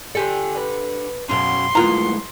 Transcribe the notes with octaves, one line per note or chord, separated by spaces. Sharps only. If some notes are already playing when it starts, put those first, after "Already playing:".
D3 G4 A4 D5 G#5
B4
F#2 B2 C#4 F#4 F5 C6
D2 F#3 G#3 A#3 B3 E4 F4 A#5